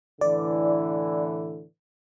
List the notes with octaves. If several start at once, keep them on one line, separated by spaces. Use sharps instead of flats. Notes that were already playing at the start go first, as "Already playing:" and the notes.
A2 D3 E3 D5